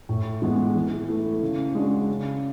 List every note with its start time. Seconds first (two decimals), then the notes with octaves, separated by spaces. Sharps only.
0.09 A2
0.42 E3 G#3 B3
0.76 E3
1.09 A3 E4
1.43 C#3
1.75 G#3 D4 F#4
2.09 C#3